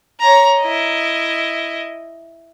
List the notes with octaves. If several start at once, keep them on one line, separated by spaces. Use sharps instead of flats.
C#5 A#5
E4 D#5